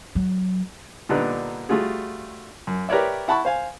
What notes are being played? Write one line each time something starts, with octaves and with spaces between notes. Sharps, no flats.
F#3
A#2 D3 G3 B3 D4 D#4
G3 A3 F4 F#4 G#4
F#2
G4 A#4 B4 C#5 D5 E5
E4 F#5 A5 B5 C#6
C5 F5 G#5